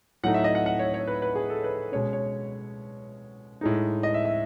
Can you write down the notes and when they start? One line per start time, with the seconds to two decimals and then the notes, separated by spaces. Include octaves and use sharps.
0.23 A2 F#3 A3 D#4 F#5
0.34 E5
0.44 D#5
0.55 F#5
0.66 F#5
0.79 C#5
0.94 C#5
1.07 B4
1.22 B4
1.35 G#4
1.50 A4
1.64 B4
1.92 B2 G#3 C#4 C#5
2.13 C#5
3.61 A2 G#3 D#4
4.03 D#5
4.14 E5
4.25 E5